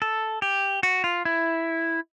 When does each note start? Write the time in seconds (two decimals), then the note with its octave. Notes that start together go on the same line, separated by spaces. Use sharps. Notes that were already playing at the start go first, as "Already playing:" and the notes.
0.02 A4
0.42 G4
0.83 F#4
1.04 F4
1.25 E4